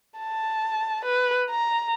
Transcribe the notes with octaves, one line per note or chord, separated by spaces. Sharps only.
A5
B4
A#5